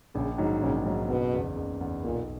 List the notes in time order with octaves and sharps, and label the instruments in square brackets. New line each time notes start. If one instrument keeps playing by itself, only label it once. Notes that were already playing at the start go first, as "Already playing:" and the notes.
[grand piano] A#1 [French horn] C#3
[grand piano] G#2 D#3 F#3 C#4
[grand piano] A#1 [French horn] C#3
[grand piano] G#2 D#3 F#3 C#4
[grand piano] F#1 [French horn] B2
[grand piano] E2 C#3
F#1
E2 C#3
[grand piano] B1 [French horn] A#2